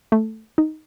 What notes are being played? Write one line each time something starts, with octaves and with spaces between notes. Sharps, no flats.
A3
D#4